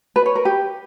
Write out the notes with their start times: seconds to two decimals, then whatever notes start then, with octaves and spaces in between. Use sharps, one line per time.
0.16 B4
0.26 C#5
0.35 A#4
0.45 G4